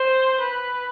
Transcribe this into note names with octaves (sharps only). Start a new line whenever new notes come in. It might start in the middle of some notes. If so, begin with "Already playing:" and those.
Already playing: C5
B4